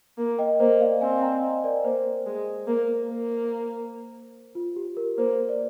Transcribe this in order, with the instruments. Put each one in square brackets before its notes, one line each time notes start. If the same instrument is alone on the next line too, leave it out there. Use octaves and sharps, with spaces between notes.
[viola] A#3
[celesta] D#5 G5
[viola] A#3 [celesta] C5 D#5
[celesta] D5 F5
[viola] C4 [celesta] F5 G#5
[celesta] G5 A#5
C5 D#5
A#4 D5
[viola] A#3 [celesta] C5
[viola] G#3
A#3
A#3
[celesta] F4
G4
A#4
[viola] A#3 [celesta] C5
[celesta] D5